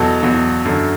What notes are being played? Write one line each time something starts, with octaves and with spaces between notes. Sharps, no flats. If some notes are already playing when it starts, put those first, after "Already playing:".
Already playing: E2 B2 F#3 A4
E2 B2 F#3
F#2 D3 F#3